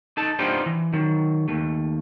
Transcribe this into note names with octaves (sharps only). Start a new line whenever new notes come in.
D#4 A4 A5
B3 D4 D#4 F4 G4 C5
E3
D#3 F#3
D#2 A3